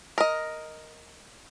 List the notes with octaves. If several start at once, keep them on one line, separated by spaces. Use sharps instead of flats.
A#4 D#5